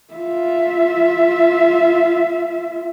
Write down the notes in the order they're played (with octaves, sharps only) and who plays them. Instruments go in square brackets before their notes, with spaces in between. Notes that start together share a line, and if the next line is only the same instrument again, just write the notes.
[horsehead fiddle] F4 E5